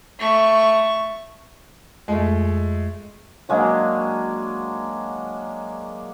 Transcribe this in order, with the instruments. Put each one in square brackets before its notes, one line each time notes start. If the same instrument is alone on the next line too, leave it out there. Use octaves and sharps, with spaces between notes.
[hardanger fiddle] A3 C#6
[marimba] F2 [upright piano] G#3 A3
[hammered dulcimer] F#3 G#3 A#3 D4